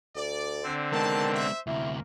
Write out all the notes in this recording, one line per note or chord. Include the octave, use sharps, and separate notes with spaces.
D2 D5
D3 C4
D#3 G#3 B3 A5
C5 E5
D2 C3 A#3 E4